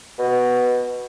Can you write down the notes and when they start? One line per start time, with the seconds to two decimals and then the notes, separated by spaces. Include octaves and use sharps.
0.19 B2